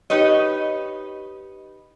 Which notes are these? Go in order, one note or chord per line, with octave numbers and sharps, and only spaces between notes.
D#4 G4 B4 C#5 D#5